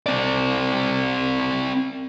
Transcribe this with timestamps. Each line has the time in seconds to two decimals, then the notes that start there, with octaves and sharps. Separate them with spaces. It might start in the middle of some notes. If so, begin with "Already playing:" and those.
0.06 C4 D5